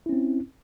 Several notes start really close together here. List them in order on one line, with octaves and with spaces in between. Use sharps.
E4 C#4 C4